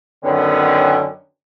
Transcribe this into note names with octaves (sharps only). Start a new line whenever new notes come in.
F#2 D3 D#3 B3 C#4